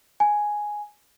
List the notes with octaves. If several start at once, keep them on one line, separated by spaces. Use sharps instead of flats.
G#5